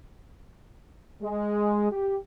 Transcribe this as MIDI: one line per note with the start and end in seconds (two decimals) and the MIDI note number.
1.22 1.90 56
1.91 2.17 67